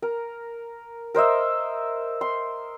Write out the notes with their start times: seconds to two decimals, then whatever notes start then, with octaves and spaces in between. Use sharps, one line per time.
0.02 A#4
1.15 A#4 C5 D#5 E5
2.21 C6